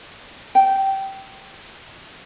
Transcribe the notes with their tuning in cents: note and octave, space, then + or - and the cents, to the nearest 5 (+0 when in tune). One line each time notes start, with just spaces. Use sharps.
G5 -15